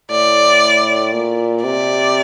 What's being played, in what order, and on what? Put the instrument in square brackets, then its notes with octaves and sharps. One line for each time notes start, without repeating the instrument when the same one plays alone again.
[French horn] A2 [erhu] D5
[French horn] A#2
[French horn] C3 [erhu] D5